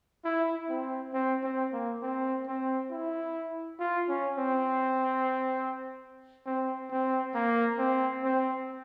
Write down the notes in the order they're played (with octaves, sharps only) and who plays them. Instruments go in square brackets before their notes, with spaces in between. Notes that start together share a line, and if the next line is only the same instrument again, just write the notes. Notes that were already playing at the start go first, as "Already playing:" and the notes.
[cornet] E4
C4
C4
C4
A#3
C4
C4
E4
F4
C#4
C4
C4
C4
A#3
C4
C4